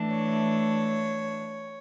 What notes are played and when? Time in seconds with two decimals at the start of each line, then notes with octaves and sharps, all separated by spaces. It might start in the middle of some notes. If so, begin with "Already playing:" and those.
Already playing: E3 A3 D4
0.10 C#5